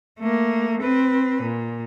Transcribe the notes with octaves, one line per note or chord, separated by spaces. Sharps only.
A3 A#3
C4 B4
A#2